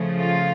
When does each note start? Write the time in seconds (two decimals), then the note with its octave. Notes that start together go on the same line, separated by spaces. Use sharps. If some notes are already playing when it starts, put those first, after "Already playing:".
Already playing: C#3 F3 A3
0.20 F4